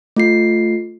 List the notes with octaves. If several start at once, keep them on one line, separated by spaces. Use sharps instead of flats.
A3 F4 C7